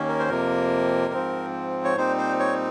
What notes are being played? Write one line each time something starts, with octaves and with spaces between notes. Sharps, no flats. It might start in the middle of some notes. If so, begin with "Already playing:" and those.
Already playing: D#2 D#3 A#3 C#4
A#4
C5
F2 C3 F3 A#3 A#4
G#2 F3 C4
C#5
A#2 G3 C4 D#4 C5
C5
C#5